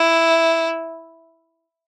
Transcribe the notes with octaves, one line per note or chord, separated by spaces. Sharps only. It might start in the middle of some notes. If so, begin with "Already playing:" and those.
Already playing: E4